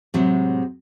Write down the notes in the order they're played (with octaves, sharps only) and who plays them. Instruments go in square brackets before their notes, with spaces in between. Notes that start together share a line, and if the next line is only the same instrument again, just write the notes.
[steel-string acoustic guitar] A2 C3 F#3 G#3